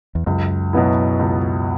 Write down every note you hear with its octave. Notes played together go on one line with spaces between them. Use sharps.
E2
C#2 F#2
B2 F#3 B3 E4
C#2